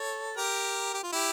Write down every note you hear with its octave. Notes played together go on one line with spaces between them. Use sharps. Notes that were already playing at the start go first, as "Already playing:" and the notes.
Already playing: A4 C#5
G4 A#4
G4
F4
E4 G4